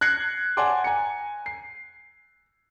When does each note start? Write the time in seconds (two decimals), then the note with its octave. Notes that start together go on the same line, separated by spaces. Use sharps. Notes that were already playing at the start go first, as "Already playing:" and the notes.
0.01 F#6 G#6 A#6 C7 C#7
0.57 D5 F#5 G#5 A5 C6 D6
0.84 G#5 A#5 C#7
1.46 C7